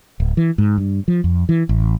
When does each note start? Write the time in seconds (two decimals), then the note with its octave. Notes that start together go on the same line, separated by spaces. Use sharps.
0.20 D1
0.37 E3
0.58 G#2
0.78 G2
1.08 F3
1.24 F2
1.49 E3
1.69 A1